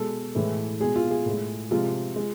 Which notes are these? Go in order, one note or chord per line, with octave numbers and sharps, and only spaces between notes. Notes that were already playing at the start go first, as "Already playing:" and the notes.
Already playing: B2 G#3 A4
A2 E3 G#3
B2 G#3 G#4
F4
G#4
A2 G#3
C3 F3 G#3 F4
G#3